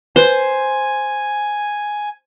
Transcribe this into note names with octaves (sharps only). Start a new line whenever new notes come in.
B4 C5 G#5